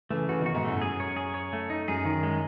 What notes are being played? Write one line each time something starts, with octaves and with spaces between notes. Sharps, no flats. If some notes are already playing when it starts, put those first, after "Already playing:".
C#3 E3 A3
C#3 E3 F#4
B2 D#3 F#4
G#2 B2
F#2 A2 A3
F#2 G#4
C#5
G#4
C#5
A3
D#4
F#2 G#4
D#3
G#3